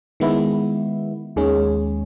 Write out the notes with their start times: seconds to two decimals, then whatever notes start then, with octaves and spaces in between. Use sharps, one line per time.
0.20 D#3 G#3 B3 E4
1.36 D#2 D#3 G#3 C#4 G#4